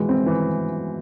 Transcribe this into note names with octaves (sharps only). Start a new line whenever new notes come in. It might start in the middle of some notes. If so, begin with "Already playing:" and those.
Already playing: B2 E3 G#3
C4
E3